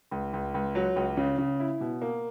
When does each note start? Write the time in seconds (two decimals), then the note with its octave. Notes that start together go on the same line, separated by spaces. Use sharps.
0.11 C#2
0.33 C#2
0.54 C#2
0.75 F#3
0.96 C#2
1.17 C#3
1.38 C#3
1.60 E4
1.81 B2
2.01 A#3